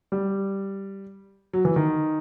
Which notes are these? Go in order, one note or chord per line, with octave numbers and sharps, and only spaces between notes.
G3
F#3
E3
D#3